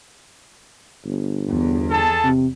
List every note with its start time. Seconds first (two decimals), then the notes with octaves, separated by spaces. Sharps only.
1.05 G1
1.50 E2
1.90 G#4 A4 A5
2.24 C3